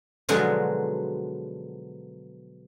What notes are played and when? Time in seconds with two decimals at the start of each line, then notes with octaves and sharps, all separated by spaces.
0.29 B2 D3 F3 F#3 G#3 F#4